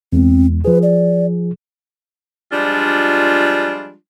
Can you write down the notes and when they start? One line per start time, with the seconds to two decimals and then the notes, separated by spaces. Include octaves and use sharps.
0.13 E2 G#3 C4
0.65 F3 G#4 B4
0.83 D5
2.52 F3 G3 G#3 D4 F4